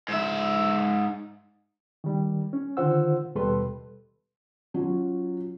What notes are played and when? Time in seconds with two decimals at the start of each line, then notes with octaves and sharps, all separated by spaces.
0.09 G#2 E5
2.04 D#3 G3
2.53 C#4
2.77 D3 D#3 F4 C5 F#5 E6
3.35 D#2 B2 G3 A4 B4 C6
4.74 F#3 C#4 F4